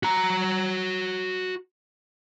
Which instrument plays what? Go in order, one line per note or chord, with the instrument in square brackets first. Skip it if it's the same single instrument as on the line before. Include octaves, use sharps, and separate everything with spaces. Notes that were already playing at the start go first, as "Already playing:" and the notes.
[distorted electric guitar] F#4 A#5